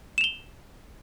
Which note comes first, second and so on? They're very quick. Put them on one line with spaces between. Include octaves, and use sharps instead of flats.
E7 F7 G7